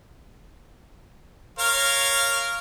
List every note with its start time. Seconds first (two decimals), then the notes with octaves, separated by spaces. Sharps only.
1.59 A#4 C#5 F5